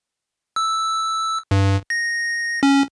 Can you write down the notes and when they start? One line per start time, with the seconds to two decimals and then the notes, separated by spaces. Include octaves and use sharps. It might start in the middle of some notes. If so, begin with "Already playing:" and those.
0.56 E6
1.51 G2
1.90 A#6
2.63 C#4